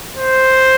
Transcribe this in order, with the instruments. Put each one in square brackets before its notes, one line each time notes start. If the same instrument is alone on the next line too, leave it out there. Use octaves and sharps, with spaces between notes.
[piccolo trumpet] C5